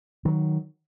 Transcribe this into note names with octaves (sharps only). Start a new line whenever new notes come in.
D#3 F#3